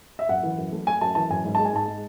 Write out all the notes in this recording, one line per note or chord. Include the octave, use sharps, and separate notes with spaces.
E5
F#2 F#5
E3
F#2
A3
A3 G#5
F#2 A5
E3 A5
F#2 G#5
G#2
G#3 A5
G#5
G#2 A5
G#3